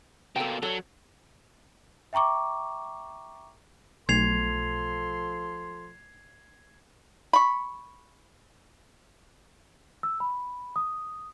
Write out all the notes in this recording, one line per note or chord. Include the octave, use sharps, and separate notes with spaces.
B2 A#3 A4 G5
F#3 A4 C#5
E5 G5 A#5 C#6 D6
B1 F3 A3 A4 C6 G#6 C7 F7
B5 C#6
E6
B5
D#6